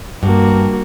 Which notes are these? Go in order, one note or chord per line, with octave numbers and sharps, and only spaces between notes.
G2 A#3 F#4